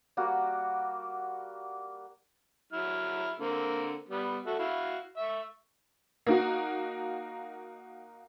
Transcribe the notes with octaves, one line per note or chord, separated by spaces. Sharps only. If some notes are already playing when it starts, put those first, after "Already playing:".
G3 A#3 F#4
F#3 E4 F6
D3 A#3 C4
G3 B3
F#4 A4 E5
E4 F#4 F5
E5 C#6
A#3 D#4 F#4